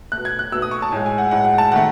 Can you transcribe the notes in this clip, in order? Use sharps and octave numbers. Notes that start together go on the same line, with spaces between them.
B2 A3 F#6
G#6
F#6
B2 A3 E6
D#6
C#6
A5
A2 G#3 G#5
G#5
F#5
A2 G#3 F#5
F#5
A5
D#3 A3 F#5